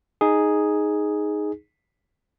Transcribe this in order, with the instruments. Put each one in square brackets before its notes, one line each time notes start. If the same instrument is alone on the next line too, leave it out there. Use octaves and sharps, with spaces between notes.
[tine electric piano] D#4 G#4